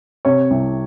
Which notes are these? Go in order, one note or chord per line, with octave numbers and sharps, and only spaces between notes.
C3 C#5
C2